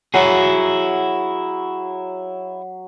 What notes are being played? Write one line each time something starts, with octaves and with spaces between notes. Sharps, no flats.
F#3 E4 F#4 G#4